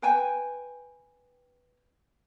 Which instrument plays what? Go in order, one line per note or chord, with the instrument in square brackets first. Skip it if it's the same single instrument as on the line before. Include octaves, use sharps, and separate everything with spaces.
[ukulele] B4 G5 G#5